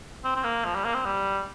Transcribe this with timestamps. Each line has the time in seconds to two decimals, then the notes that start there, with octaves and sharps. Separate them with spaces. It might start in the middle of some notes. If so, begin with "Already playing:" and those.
0.24 C4
0.35 C4
0.44 A#3
0.64 F3
0.75 G3
0.85 A#3
0.94 C4
1.05 G3